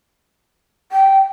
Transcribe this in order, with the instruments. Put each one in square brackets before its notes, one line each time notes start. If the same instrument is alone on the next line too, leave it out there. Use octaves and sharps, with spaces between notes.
[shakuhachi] G5